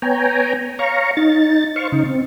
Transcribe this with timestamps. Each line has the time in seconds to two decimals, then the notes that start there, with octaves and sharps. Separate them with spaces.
0.02 B3 C#5 G5 G#5 A#5
0.79 C#5 F5 A#5 C#6
1.17 D#4 A6
1.76 C5 F5 C#6
1.92 C#3 D#4
2.06 C4